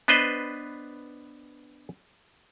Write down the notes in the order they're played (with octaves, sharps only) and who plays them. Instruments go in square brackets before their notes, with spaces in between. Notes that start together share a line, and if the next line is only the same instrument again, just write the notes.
[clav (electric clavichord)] B3 D4 B4 C5 D#5